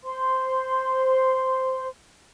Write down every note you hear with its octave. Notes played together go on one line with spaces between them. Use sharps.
C5 C6